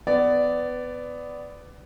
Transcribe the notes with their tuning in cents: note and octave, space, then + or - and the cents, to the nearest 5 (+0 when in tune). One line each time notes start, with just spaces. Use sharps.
B3 +20 D5 +0